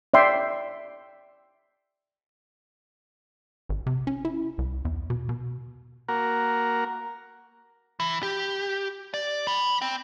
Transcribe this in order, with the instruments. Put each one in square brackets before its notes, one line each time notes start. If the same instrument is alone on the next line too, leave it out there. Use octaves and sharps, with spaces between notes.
[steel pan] D5 E5 G5 C6
[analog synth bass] G#1
C3
C#4
E4
C2
E2
B2
B2
[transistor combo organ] A#3 F#4 A#4
[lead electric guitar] E3
G4
D5
G5 B5
C4